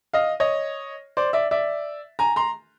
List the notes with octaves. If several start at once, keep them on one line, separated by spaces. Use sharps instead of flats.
D#5 F5
C#5 D#5
C5 D5
D5 E5
D5 E5
G#5 A#5
A#5 C6